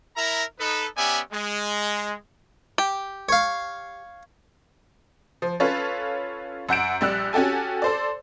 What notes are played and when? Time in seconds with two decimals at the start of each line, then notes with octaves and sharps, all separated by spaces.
0.16 E4 A#4 E5 A#5
0.59 D#4 A4 B4
0.97 B3 C#4 G4 D5 E5 G#5
1.33 G#3
2.78 G4
3.29 C#5 F5
5.42 F3
5.60 C#4 F4 A4 B4 C#5
6.69 F#2 F#5 G6 D7
7.01 A#1 G3 E6 F#6
7.33 C#4 F#4 G4 A4 G#5
7.82 A4 C5 D5